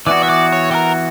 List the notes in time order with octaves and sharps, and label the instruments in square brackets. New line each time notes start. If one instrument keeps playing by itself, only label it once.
[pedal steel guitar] E3 B3 F#4 [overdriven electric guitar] D5
[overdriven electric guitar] E5
D5
C#5
G4
A#4